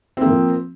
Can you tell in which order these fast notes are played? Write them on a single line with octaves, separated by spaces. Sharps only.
C4 A#3 F3